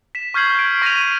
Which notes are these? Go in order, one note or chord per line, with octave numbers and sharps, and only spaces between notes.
B6 E7
C#6 F6 G6 G#6 C7 F#7
F6
D7
C#6 A#6 C7 D#7 F7
F7